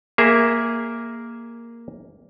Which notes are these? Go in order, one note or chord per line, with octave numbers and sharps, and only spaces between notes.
A#3 G#4 A#4 E5